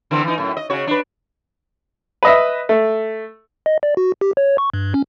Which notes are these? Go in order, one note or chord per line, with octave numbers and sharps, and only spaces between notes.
D3 E3 C4
E3 D#4
F#2 A2
D#5
C#3 F#4 C#5
D4 B4
B4 D#5 E5
A3
D#5
D5
F#4
G4
C#5
C#6
G2
C#4